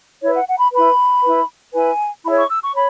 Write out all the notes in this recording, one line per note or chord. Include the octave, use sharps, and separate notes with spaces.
E4 B4 C#5
F#5
F#5
B5
E4 B4 B5
E4 B4
E4 B4 G#5
E4 G#4 C#5 B5
C#6
E6
C#6
C#5 B5